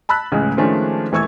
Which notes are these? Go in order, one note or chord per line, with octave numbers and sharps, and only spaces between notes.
A5 B5 E6 F#6 B6
C#2 A2 C#3 E3 G#3
D#3 F3 G#3 A3 C#4 D4
D#1 E3 A3 C#6 E6 G#6